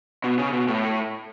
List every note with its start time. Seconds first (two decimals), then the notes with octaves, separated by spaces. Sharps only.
0.24 B2
0.38 C#3
0.53 B2
0.68 A2